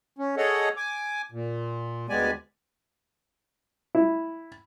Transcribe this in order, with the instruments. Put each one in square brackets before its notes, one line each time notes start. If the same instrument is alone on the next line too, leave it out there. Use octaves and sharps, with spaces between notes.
[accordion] C#4
G#4 A4 C#5 D#5 F#5
G#5 D6
A#2
D2 G#3 B3 G4 D5 G#5
[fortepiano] E4